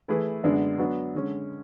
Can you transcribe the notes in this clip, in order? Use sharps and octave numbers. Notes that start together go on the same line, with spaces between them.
E3 A3 E4 G#4 B4
F#2 D3 G#3 B3 D4
F#3 B3 D4
D3 G#3 C#4